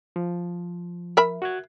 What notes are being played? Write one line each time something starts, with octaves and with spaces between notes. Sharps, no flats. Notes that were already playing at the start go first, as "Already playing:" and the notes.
F3
A#4 E5 B5
F#4 F#6 G#6